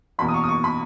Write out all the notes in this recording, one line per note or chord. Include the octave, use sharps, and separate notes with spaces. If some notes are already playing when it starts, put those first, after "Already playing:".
F#1 E2 B2 A#3 B5
D#6
C#6
D#6
C#6
B5